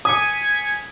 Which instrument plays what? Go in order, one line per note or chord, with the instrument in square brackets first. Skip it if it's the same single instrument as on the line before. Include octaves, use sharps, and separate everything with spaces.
[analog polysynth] G#5 B6 C#7 [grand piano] D#6